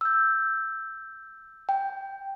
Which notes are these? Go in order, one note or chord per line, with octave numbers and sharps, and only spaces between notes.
E6 G6
G5